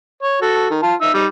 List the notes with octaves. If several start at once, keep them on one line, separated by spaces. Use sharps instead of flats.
C#5
F#4 A4
D#3
F4 A5
D#4 E5 E6
G3 D#4